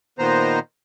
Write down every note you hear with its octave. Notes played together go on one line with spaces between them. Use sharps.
A#2 D#3 B3 C5 A#5